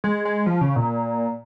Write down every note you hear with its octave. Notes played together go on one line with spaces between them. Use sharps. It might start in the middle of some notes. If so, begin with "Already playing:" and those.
G#3
G#3
F3
C#3
A#2